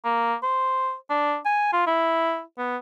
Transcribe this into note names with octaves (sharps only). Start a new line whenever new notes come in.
A#3
C5
D4
G#5
F4
E4
B3